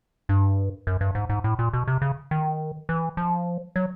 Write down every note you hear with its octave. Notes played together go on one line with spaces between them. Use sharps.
G2
F#2
G2
G#2
G#2
A2
A#2
B2
C3
C#3
D#3
E3
F3
F#3